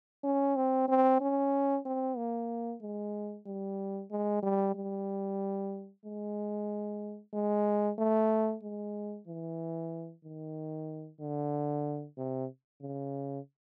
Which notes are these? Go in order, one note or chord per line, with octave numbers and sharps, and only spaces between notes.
C#4
C4
C4
C#4
C4
A#3
G#3
G3
G#3
G3
G3
G#3
G#3
A3
G#3
E3
D#3
D3
C3
C#3